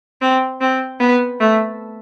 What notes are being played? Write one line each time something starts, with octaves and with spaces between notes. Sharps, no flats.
C4
C4
B3
A3